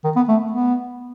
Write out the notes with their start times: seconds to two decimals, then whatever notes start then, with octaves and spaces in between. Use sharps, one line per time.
0.04 D#3
0.16 B3
0.28 A3
0.52 B3